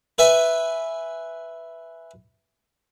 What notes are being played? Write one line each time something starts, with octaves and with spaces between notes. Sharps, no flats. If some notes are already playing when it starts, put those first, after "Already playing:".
B4 E5 G#5